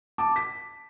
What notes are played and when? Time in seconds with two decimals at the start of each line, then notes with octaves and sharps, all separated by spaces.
0.18 A5 D6
0.36 B6